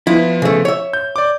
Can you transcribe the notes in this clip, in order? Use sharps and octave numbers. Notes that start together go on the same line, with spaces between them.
F3 B3 E4
C#3 A3
C#5 E5
G6
D5 D6